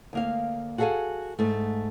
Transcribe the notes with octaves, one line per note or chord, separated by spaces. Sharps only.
D2 A#3 F5
F#4 G#4 A4 E5 F5 G#5
G#2 A3